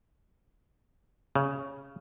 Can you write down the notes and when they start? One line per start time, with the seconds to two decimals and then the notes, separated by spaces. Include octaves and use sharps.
1.36 C#3